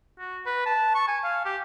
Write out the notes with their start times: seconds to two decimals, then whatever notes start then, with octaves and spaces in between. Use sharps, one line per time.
0.19 F#4
0.46 B4
0.66 A5
0.95 C#6
1.08 G#5
1.24 F5
1.45 G4